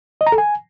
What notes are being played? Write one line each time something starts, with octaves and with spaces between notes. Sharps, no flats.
D#5
A#5
A4
G#5